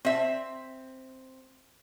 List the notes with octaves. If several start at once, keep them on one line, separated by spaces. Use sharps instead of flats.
C4 E5